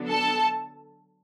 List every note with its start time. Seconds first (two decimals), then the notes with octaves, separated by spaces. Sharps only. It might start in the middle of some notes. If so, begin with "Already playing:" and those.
Already playing: D3 F#3 B3 D4
0.09 A4 A5